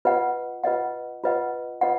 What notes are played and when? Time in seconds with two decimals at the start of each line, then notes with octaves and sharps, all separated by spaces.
0.05 F4 B4 D#5 F#5
0.64 F4 B4 D#5 F#5
1.24 F4 B4 D#5 F#5
1.81 F4 B4 D#5 F#5